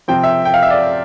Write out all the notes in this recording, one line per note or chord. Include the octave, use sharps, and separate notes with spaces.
C3 F3 C4 G5
E5
G5
F5
E5
D5